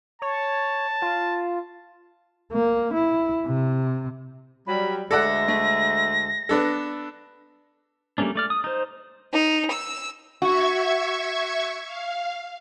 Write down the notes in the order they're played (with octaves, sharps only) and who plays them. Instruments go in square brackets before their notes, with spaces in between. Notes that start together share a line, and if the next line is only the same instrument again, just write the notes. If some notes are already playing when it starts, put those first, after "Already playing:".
[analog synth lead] C#5 [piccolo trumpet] A5
[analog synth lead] F4
[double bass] A#3
E4
C3
[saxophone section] F#3 G3 [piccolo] B5
[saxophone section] D2 G#3 E5 [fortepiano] A4 D5 F#5 [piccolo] A#6
[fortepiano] A3
B3 D4 A4
[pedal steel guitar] G3 A3 A#3 C#4 D4
A3 D5 F6
D#6
D#4 C5
[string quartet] D#4
E6
[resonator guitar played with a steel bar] F#4 [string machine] E5 C#6 G#6
[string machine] F5